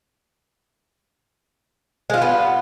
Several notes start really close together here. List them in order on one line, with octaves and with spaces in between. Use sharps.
G#3 F4 G3 B3